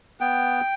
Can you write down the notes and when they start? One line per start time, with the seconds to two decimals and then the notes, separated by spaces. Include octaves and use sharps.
0.20 B3 G5